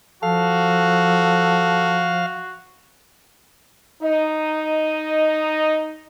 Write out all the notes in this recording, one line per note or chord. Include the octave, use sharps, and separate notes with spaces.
F3 F#4 A4 F5
D#4 D#5